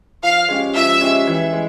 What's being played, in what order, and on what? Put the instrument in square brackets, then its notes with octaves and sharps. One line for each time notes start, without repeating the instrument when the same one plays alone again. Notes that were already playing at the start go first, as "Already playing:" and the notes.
[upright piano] F3 [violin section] F5
[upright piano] G#3 C#4 G4
[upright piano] F3 [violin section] E5
[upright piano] G#3 C#4 G4
E3
G#3